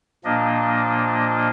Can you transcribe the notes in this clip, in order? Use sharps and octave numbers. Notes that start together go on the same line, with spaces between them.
A#2 F3 A#3 D4 D#5